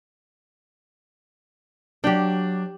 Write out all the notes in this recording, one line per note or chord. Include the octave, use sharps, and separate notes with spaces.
F#3 D4 G4 G5